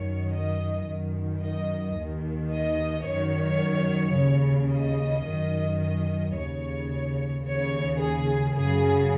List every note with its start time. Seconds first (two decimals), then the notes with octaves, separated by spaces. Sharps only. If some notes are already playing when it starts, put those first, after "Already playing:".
Already playing: F#2 D#3 C#5
0.31 D#5
0.86 F#2 D#3
1.41 D#5
1.96 D#2 D#3
2.51 D#5
3.05 F#2 D#3 C#5
4.15 D#2 C#3
4.70 D#5
5.25 F#2 D#3
5.80 D#5
6.34 D#2 C#3 C#5
7.44 D#2 C#3 C#5
7.98 G#4
8.53 F#2 C#3 G#4